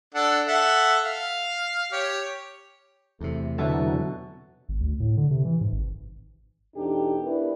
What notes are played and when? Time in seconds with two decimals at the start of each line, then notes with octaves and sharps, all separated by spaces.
0.15 D4 A4 F#5
0.48 A4 E5 F#5
1.05 F5
1.92 G4 C#5
3.20 E2 C3 A3
3.58 B2 D3 E3 F#3 E5 A5
4.69 G#1
4.80 D2
5.00 A2
5.17 D3
5.31 C3
5.45 E3
5.61 G#2
5.72 G#1
6.75 E2 B2 D4 D#4 G4 A4
7.22 B3 D4 E4 G4 A#4 B4